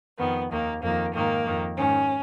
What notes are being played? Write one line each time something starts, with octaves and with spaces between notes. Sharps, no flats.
F2 D#3 B3
D#2 D#3 A#3
F2 D#3 A#3
G#2 D#3 A#3
F2 D#3
G#2 D#3 C#4